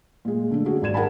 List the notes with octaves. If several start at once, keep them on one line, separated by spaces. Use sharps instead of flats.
A#2 G#3
D3 A3 D4
D3 C#4 F#4 G#4
G#1 D5 G#6 E7
G#4 A#4 F#5 G5 A5 B5